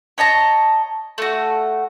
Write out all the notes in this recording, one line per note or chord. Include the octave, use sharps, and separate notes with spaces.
C#5 D#5 A5 A#5
A3 F#4